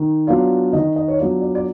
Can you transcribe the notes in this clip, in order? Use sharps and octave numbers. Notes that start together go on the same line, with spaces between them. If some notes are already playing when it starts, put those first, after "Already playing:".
Already playing: D#3
F#3 B3 D4 F4 D5
D#3 D#5
D#5
C#5
F#3 B3 D4 F4 D5
D5
D5